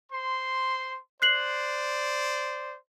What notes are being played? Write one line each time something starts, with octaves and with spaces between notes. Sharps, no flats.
C5 C6
C5 D5 F#6 C7 F#7